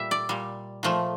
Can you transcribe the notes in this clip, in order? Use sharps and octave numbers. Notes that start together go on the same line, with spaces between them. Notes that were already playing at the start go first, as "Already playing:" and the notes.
Already playing: A#2 G3 E5
D5
A#2 G3
A#2 F3 A3